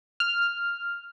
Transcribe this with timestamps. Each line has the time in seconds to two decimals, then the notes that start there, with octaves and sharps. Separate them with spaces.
0.20 F6